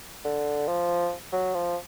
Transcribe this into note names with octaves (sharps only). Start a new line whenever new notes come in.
D3
F3
F#3
F3